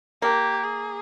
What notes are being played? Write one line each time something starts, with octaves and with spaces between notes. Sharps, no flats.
A#3 G4
G#4